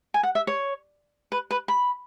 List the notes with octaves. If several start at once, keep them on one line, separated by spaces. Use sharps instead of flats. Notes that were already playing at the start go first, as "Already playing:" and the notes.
G#5
F#5
E5
C#5
B4
B4
B5